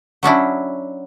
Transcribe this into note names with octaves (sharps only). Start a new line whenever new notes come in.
F#3 C#4 D4 E4